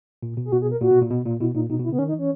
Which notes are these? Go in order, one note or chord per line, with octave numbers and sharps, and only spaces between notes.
A#2
B2
G#4
B2 F#4
G#4
A#4
A#2 F#4
B2
A#2
B2
A#2
B2 E4
A#2 D#4
B2 D#4
B2
E4
C#3
B3
D#3 C#4
D#4
E3
C#4